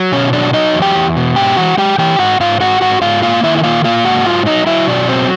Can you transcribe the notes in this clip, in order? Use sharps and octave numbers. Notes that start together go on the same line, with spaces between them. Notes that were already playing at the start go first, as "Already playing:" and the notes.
Already playing: F#3
B2 C#4 C#5
F#3 D4 D5
F#3 D#4 D#5
E2
G4 G5
E2
B2
G#2 G4 G5
E3 F#4 F#5
G#3 G4 G5
E3 G4 G5
G#2 F#4 F#5
G#2 F4 F5
G#2 F#4 F#5
G#2 F#4 F#5
G#2 F4 F5
A#3 F4 F5
D#3 E4 E5
E5
A#3 F4 F5
A#3 F4 F5
G#2 F#4 F#5
F#3 F4 F5
F#3 D#4 D#5
F#3 E4 E5
B2 D4 D5
F#3 C4 C5